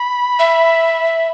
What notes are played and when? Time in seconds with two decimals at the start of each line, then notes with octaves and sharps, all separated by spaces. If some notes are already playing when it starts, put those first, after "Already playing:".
Already playing: B5
0.39 E5